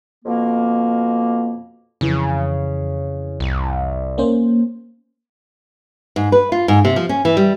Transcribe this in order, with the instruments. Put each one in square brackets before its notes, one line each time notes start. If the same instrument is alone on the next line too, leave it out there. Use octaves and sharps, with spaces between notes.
[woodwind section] F2 B2 A#3
[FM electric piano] F2 E3 [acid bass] C#3
[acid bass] C2
[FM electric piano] A#3 C#4 C5
[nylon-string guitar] G#2
B4
F4
G#2
C3
F3
C#4
E3
G3